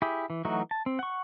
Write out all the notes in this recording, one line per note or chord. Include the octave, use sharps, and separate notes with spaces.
E4 G4 G#4
E3
E3 F#3 A3 D#4 F#4
A5
C4
F#5 C#6